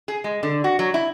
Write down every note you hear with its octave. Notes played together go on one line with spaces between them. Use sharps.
G#4
G#3
D3
F#4
F#3
E4